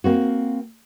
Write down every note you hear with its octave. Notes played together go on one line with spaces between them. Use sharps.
A#3 C4 F#4